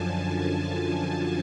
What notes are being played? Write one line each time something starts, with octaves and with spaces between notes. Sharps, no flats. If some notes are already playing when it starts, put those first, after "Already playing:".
Already playing: F#2 D3 F3 G#5 A5
A5
G#5